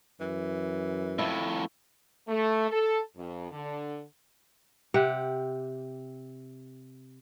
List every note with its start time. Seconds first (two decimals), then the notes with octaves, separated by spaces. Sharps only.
0.20 F#2 E3
1.19 F2 A2 E4
2.28 A3
2.71 A4
3.17 F2
3.51 D3
4.94 C3 G4 F#5